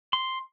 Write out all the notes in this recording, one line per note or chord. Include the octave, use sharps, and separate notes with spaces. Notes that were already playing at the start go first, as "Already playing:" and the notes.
C6